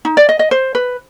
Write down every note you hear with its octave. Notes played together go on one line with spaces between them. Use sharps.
D#4
D5
D#5
D#5
C5
B4